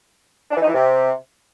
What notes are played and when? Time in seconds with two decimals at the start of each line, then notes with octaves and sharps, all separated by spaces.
0.50 D4
0.56 E3
0.62 D#4
0.67 E3
0.73 C3